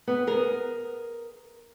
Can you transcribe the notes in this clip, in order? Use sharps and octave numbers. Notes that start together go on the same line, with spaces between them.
B3
G#4 A#4